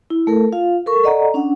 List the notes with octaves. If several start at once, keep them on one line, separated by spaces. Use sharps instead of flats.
E4
A3 A4 A#4
F4 F5
A4 A#4 C#6
A4 D5 D#5 F#5 A#5
C#4 D4 F#5